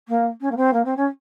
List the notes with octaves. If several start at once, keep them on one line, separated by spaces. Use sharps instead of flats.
A#3
C#4
A#3
C4
A#3
C4
C#4